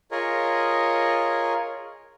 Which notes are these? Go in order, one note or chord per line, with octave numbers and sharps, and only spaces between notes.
F4 G#4 A#4 C#5 D#5